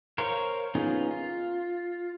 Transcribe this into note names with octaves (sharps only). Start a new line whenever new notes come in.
A#4 C5 C#5 F5
B3 C#4 D#4 F4 G#4
F4